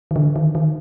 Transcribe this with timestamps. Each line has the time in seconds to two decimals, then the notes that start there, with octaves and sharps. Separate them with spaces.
0.11 D#3
0.16 D3
0.36 D#3
0.55 D#3